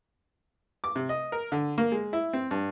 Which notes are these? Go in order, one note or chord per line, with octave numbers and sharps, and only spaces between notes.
D6
C3
D#5
A#4
D3
A#3
G#3
E4
C4
G2